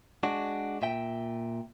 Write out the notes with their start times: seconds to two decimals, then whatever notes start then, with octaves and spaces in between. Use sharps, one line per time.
0.23 G#3 D4 F#4
0.82 A#2 E5 G5